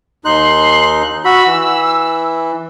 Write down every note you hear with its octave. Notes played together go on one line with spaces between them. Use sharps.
D#2 D#4 C6 F#6
F#4 B5 E6
E3